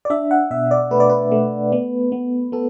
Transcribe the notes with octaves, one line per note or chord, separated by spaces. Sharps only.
D5
D4 E5
F#5
B2 E5
D5
A3 B4
D5
B4
A3
B3
B3
B3 A4